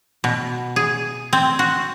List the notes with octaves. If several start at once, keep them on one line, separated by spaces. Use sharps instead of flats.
B2
G#4
C4
F#4